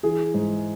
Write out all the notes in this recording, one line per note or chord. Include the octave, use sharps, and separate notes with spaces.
E3 G#4
G#2